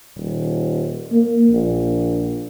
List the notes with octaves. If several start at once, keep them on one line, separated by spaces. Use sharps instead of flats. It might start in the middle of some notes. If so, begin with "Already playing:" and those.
D#1
A#3
A#1